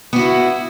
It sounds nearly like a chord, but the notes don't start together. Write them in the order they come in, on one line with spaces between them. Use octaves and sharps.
B3 F#4 E4